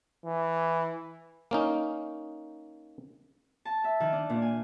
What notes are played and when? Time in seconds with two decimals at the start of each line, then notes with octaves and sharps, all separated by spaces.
0.24 E3
1.51 A#3 C#4 D#4
3.65 A5
3.84 E5
4.00 D#3
4.13 D4
4.30 A#2
4.42 G#5